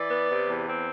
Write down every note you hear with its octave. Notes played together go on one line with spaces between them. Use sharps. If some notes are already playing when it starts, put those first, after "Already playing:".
Already playing: E3 D5
B3
C3
E2
C4